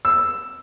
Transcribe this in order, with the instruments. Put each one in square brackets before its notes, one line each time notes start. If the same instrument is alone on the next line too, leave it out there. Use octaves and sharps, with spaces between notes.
[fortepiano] E6